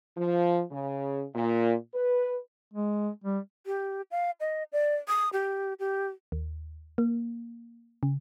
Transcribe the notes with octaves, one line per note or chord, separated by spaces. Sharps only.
F3
C#3
A#2
B4
G#3
G3
G4
F5
D#5
D5
D#6
G4
G4
D#2
A#3
C#3